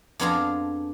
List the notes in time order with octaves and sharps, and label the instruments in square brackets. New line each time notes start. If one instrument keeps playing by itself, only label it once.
[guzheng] F2 B3 D4 F4 G#4 A#5